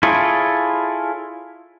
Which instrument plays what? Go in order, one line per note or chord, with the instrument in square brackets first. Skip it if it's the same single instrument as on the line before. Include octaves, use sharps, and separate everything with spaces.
[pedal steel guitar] E4 F4 G#4 A4 C#5